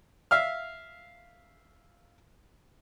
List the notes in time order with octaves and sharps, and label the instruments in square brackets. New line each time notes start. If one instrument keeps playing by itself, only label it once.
[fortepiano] E5 F5 F6